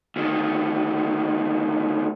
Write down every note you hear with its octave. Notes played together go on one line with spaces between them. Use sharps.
D2 D#3